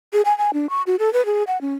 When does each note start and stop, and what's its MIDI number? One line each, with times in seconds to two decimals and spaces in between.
0.13 0.22 68
0.25 0.36 80
0.38 0.51 80
0.54 0.69 62
0.70 0.82 85
0.87 0.96 66
0.99 1.12 69
1.13 1.25 71
1.26 1.43 68
1.47 1.60 78
1.61 1.75 61